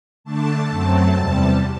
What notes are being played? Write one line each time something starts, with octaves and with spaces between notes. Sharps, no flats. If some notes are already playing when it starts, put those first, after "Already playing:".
D3 A3 D4 A5
F#2 F#3 A3 C4
E2 C3 G3